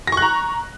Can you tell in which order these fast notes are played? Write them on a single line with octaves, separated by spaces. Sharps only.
A#6 C#6 F#6 A#5